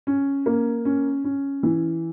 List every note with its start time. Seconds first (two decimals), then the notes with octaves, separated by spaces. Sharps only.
0.07 C#4
0.46 A#3
0.85 C#4
1.24 C#4
1.63 E3